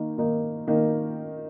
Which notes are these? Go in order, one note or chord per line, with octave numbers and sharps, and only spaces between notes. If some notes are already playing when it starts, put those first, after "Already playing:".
Already playing: D#3 A#3 D#4
D#3 A#3 D#4
D#3 A#3 D#4